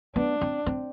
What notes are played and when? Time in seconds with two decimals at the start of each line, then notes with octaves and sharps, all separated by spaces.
0.16 B3 D4
0.41 C4
0.66 C4